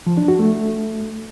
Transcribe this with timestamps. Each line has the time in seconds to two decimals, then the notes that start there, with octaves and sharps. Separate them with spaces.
0.06 F3
0.17 D4
0.28 F#4
0.39 A3